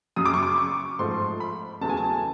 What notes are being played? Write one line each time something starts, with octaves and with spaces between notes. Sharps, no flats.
F#2 C#3 F#3 D#6
D6
C#6
D6
C#6
G#2 F3 A3 C6
B5
E2 C#3 F#3 A3 A5
G#5
A5